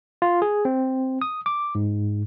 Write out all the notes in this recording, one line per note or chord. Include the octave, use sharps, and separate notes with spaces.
F4
G#4
C4
D#6
D6
G#2